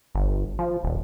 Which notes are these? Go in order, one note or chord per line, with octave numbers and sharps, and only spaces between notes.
G1
F3
D#1